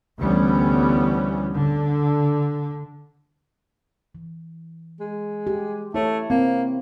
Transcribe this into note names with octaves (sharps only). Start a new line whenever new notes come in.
D2 E3 G3 B3 C#4
D3
E3
G#3
G4
A3 E4 C#5
A#3 C4